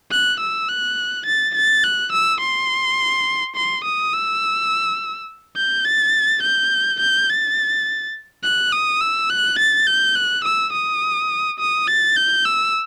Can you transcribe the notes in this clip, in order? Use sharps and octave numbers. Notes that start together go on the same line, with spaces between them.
F#6
E6
F#6
A6
A6
F#6
E6
C6
C6
D#6
E6
G6
A6
G6
G6
A6
F#6
D#6
E6
F#6
A6
G6
F#6
E6
D#6
D#6
A6
G6
E6